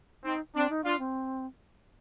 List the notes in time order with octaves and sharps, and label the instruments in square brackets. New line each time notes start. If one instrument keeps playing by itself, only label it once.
[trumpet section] C4 [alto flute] D#4
[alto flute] C4 [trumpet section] D4
[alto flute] D#4
[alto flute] D4 [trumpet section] F4
[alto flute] C4